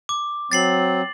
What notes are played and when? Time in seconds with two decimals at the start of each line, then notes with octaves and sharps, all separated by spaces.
0.09 D6
0.52 F#3 C4 A6 C7 F#7